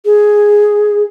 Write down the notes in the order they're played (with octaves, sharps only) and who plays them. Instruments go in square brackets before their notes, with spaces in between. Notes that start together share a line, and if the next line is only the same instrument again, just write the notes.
[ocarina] G#4